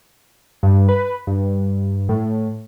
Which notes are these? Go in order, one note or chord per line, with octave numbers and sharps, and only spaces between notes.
G2
B4
G2
A2